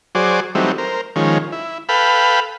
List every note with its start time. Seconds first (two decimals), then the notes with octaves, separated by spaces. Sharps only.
0.15 F#3 G#4 C5 D5
0.55 E3 F#3 G3 A3 C4 D#4
0.78 A#4 C5
1.16 D#3 F3 G#3 C#4
1.52 E4
1.89 A4 B4 F5 G5 B5